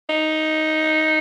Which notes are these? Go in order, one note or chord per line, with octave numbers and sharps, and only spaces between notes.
D#4